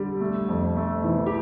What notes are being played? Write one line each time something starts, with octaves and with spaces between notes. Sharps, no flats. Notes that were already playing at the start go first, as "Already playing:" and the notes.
Already playing: D3 G3
A3
F2
A3
E3
G4